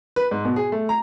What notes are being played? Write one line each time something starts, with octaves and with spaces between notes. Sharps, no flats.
B4
G#2
B2
G#4
A3
A#5